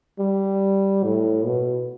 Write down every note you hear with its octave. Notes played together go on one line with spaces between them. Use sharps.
G3
A2
B2